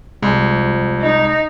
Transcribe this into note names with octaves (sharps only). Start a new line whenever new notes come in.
C2 F3 G#3
D#4